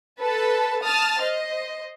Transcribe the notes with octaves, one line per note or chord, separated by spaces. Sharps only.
A4 B4 A5
A5 D#6 F6 A6
C5 D#5